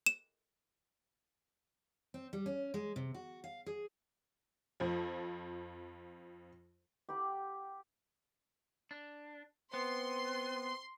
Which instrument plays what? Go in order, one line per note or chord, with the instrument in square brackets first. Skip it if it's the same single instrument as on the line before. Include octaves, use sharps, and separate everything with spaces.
[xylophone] E7
[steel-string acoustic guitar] C4
G3
C#4
G#3
C3
F#4
F5
G#4
[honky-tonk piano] F2 F3
[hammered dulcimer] G4 F#5 B5
[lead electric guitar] D4
[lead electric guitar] B3 [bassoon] C4 [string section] C6